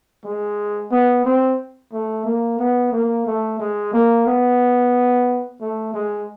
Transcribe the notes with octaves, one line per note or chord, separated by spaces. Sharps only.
G#3
B3
C4
A3
A#3
B3
A#3
A3
G#3
A#3
B3
A3
G#3